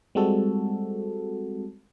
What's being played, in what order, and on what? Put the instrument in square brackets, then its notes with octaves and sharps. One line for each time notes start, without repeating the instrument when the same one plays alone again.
[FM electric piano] G3 G#3 C4 F#4 A4